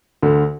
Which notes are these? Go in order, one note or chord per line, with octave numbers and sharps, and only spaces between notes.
D2 D3